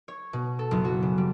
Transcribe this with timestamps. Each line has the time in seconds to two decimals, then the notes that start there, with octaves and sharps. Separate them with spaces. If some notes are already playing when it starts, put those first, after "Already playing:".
0.08 C#5
0.33 B2
0.59 A4
0.71 F#1
0.85 F#4
1.02 C#3
1.18 G3